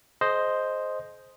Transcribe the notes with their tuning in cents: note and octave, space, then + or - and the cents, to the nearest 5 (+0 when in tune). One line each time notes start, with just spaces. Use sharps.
G#4 +40 C5 +0 D#5 +0